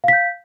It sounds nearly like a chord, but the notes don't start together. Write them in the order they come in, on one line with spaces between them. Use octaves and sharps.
F5 B6 G6